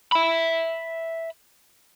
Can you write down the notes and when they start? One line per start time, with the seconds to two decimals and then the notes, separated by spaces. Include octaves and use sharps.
0.12 E5 B5